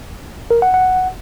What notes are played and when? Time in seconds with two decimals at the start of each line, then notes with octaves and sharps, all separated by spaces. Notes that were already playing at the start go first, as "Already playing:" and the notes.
0.51 A#4
0.62 F#5
0.74 F#5